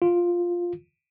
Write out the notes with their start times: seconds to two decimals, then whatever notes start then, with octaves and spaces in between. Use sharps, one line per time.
0.02 F4